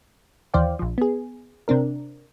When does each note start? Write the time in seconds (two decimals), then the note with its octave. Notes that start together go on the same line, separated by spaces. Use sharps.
0.54 D#2 E3 C5 D5 F5 G5
0.79 A#1 F3
0.98 B3 G#4
1.68 C3 C4 D4 A#4